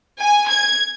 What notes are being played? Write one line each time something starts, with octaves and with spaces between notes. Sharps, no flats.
G#5
G#6